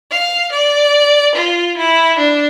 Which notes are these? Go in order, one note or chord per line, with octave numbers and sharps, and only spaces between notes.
F5
D5
F4
E4
D4